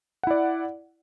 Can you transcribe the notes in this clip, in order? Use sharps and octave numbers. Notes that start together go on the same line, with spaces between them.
E4 D5 F#5